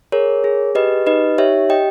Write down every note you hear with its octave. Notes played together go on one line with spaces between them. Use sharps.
G#4 A#4 C#5
G#4
G4 B4 D#5
D#4 B4 D#5
G4 C#5 E5
G4 D#5 G5